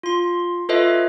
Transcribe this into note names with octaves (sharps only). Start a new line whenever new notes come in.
F4 C6
F4 A4 B4 C#5 D#5 E5